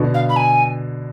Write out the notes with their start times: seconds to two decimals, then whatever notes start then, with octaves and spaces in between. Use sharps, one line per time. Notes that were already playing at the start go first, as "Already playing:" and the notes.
Already playing: B2 D3
0.14 F5
0.29 B5
0.36 G#5